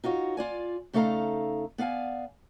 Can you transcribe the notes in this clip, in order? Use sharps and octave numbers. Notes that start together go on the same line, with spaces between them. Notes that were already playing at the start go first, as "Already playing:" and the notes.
D#4 F4 F#4 C#5
F4 D5 G#5
C#3 A3 D#4 A4 F5 A#5
B3 D5 F5 F#5 G#5